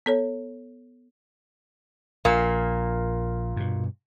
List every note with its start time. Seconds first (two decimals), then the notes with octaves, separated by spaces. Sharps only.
0.06 B3 A4 C#5
2.25 A#1 A#2 A#3
3.56 G2 B2